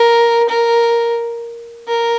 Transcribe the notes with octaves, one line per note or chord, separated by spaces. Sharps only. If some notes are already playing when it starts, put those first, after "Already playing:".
Already playing: A#4
A#4
A#4